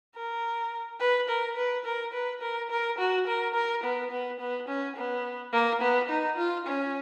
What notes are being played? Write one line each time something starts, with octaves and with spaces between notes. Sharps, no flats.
A#4
B4
A#4
B4
A#4
B4
A#4
A#4
F#4
A#4
A#4
B3
B3
B3
C#4
B3
A#3
B3
D#4
F4
C#4